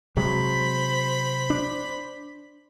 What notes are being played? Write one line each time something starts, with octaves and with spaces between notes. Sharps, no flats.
C3 F#3 G#3 C5 B5
D4